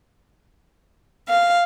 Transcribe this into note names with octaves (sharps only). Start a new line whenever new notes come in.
F5